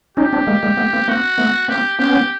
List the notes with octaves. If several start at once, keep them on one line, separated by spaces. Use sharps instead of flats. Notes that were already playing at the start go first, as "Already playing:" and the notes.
C#4 D#4 G4
C4 D4
G#3 A#3
G#3 A#3
A3 B3
A#3 C4
A#3 C4 F#4
A3 B3
A#3 C4 G4
B3 C#4 G4